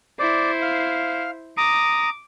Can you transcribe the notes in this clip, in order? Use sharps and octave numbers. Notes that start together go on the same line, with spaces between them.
E4 C5 D5
F5
A#5 D6 D#6